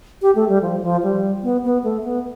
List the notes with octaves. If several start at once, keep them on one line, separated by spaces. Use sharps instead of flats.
G4
A3
G3
F3
F3
G3
B3
B3
A3
B3